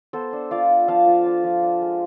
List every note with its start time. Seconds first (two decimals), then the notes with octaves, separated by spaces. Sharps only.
0.13 B3 A4 C5
0.33 D4
0.51 F4 D5 F5
0.69 F4
0.88 F3 F5 A5
1.06 F3
1.26 D4
1.44 F3
1.63 D4
1.82 G#3